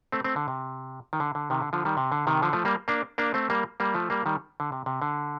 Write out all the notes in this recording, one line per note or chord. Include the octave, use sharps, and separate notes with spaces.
A3 C4
A3 C4
D3
C3
D#3
D3
D3
C3 D#3
D3
D3 F3
D#3 G3
C3
D3
C3 D#3
D3 F3
F3 A3
G3 A#3
A#3 D4
A#3 D4
A3 C4
G3 A#3
G3 A#3
F3 A3
G3 A#3
D#3 G3
D3
C3
C3
D3